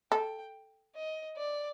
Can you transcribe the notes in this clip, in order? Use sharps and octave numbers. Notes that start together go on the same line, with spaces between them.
A4 G5
D#5
D5